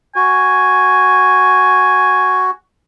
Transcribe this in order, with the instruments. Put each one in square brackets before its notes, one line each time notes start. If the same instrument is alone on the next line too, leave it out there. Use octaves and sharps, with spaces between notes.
[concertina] F#4 [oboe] G#5